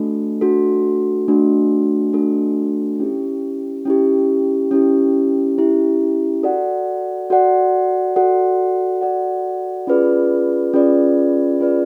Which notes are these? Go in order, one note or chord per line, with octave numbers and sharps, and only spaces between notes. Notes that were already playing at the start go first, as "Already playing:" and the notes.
Already playing: A3 D4 F#4 A4
A3 D4 F#4 A4
A3 D4 F#4 A4
A3 D4 F#4 A4
C#4 E4 G4
C#4 E4 G4
C#4 E4 G4
C#4 E4 G4
F#4 A4 D5 F#5
F#4 A4 D5 F#5
F#4 A4 D5 F#5
F#4 A4 D5 F#5
C#4 F4 G#4 B4 D5
C#4 F4 G#4 B4 D5
C#4 F4 G#4 B4 D5